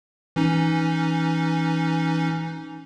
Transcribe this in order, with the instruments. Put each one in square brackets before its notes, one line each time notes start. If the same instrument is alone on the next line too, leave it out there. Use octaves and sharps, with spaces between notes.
[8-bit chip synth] E3 C#4 D#4